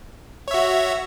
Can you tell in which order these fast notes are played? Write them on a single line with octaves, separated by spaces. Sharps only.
C#5 E5 F#4